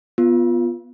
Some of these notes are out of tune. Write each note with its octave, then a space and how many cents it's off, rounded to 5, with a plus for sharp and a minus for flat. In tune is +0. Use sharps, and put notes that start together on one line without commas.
B3 +0 F4 +0